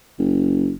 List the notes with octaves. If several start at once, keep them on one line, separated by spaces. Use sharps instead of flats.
F#1